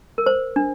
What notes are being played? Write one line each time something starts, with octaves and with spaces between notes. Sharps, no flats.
A#4
C5
D4